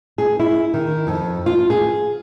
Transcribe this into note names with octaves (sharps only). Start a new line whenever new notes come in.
G#4
E4
D#3
F2
F4
G#4